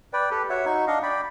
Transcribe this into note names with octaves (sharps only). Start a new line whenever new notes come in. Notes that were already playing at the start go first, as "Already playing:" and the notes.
B4 D5 G5
G4 A4 B4
F#4 C#5 E5 F#5
D#4 F#4 C#6
D4 D#5 F5
D5 G5 B5